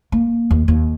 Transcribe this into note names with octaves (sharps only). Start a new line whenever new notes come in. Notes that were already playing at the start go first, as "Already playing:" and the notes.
A#3
D#2
D#2